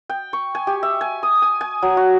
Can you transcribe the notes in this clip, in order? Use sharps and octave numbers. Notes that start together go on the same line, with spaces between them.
G5
C#6
G#5
G4
E5
G#5
D#6
G#5
G#5
F#3
F#4